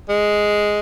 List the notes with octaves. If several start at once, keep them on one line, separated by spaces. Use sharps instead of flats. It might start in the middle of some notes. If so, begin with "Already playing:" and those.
G#3